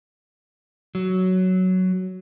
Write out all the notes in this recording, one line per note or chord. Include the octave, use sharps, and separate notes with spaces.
F#3